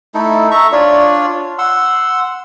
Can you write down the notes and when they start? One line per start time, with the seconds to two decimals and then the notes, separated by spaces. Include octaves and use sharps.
0.14 A3 D#4 E4 A4
0.51 E5 A#5 C#6
0.72 D4 F4 C#5 D5
1.59 F#5 C6 E6